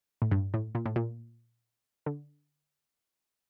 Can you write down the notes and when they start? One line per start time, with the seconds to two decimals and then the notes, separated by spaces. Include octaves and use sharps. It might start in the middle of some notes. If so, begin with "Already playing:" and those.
0.22 A2
0.31 G2
0.54 A2
0.75 A#2
0.86 A2
0.96 A#2
2.06 D3